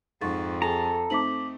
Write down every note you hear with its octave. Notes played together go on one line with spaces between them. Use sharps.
F2 G#2 C#6 A6
G#4 A4 A#5
A3 C4 D#4 D6 B6 F#7